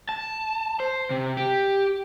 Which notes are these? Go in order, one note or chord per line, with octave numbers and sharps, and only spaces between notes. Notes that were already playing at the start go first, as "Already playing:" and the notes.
A5
C5
C3
G4